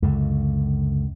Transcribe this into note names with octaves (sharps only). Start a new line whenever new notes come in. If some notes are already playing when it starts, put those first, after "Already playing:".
C#2 F#2 D3